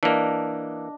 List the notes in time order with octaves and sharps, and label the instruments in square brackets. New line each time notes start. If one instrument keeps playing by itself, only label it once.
[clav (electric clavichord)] E3 A#3 [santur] D4 D#5